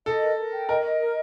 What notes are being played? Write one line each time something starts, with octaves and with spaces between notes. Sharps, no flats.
A4 D#5
A#4
A#4
G5
A#4 D#5
D#5
A#4